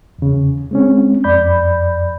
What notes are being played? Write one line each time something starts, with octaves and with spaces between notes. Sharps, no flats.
E2 C#3
G#3 C4 C#4
F2 D5 B5 G6